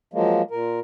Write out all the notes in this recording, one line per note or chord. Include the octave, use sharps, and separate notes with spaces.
F3 F#3 G#3 A#3
A#2 A#4